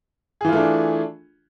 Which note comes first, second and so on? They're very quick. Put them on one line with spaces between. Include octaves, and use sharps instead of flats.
G#4 E3 F4 A3 D4